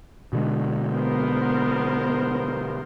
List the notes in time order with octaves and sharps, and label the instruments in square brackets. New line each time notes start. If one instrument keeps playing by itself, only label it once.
[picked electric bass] B2 D3 G#3
[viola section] B3 A#4 C5